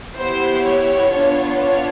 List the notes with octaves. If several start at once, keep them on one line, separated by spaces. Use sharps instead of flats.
B3 E4 G4 C5
C#5
B3 D4 F4
C#5